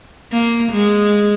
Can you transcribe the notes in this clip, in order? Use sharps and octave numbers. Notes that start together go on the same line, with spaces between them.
A#3
G#3